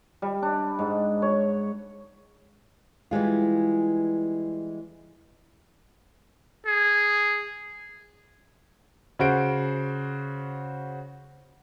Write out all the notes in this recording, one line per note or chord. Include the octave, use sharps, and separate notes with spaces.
G3
D4
G#2
C#5
E3 G3 G#3 F4
G#4
C#3 F#4 C5 D7